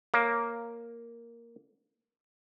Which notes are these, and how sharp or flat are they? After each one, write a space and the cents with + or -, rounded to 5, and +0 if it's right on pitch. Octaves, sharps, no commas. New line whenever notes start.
A#3 +0 C#5 +0